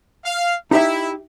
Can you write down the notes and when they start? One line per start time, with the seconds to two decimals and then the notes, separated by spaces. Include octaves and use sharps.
0.24 F5
0.71 D#4 E4 G4 E5